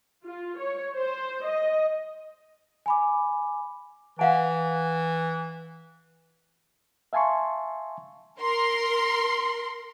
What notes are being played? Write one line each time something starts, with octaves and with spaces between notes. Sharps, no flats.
F4
C#5
C5
D#5
G#5 B5 D6
E3 F5 F#5 G#5
E5 F5 G#5 A5 C6 C#6
A#4 C6